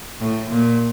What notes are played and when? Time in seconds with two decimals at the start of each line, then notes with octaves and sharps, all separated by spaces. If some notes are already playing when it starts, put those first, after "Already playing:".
0.20 A2
0.50 A#2